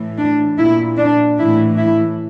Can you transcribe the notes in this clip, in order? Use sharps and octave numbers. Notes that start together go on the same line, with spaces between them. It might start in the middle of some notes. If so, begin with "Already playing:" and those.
Already playing: A2 E3
D4
A#2 E4
D4
A2 E3 E4
E4